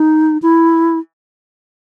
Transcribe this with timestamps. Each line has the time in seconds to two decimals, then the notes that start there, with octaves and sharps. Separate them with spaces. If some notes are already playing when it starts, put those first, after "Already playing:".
Already playing: D#4
0.42 E4